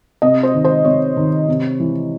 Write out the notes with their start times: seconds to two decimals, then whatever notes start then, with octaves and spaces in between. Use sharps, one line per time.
0.22 C3 D#5
0.43 C5
0.54 D#3
0.65 C5
0.85 C3 C#5
1.17 D#3
1.48 C3
1.80 E3